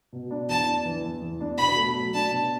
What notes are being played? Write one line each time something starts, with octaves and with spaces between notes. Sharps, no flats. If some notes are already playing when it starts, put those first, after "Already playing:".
B2
D4
E2 A5
D4
E3
E2
E2
D4
B2 B5
A3
F#3
D4 A5
B2